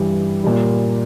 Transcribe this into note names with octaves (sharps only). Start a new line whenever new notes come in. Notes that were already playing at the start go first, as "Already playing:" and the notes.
Already playing: G2 E3 G3
A#2 G3